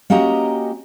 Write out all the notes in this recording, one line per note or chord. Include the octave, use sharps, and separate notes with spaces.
A#3 C#4 F#4 G4 D#5 A#5